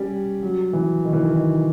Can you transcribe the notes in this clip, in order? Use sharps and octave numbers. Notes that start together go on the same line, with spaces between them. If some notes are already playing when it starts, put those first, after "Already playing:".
Already playing: G3 C#4
F#3
E3
D#3
E3
D#3
D#3